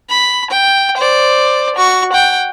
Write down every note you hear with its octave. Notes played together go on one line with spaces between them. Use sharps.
B5
G5
C5 D5
F#4 C#6
F#5 G5